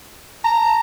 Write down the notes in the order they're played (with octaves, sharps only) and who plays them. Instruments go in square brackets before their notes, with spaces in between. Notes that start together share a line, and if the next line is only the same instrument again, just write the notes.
[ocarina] A5 [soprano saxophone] A#5